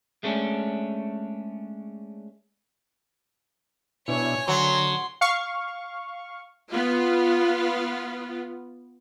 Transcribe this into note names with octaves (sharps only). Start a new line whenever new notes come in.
G#3 A3 C#4 D4
B2 D4 E4 C#5 G#5
D3 F#3 C6
F5 C#6
B3 F4